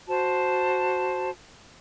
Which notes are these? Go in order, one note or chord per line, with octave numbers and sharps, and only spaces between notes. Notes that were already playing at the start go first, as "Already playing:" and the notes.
F#4 C5 A5